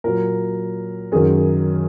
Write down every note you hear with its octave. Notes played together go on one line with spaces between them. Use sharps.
A#2 F#3 A#4
F#2 D#3 F#3 G#4